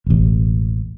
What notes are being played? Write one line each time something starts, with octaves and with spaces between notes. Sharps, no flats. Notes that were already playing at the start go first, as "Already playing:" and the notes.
E1 A1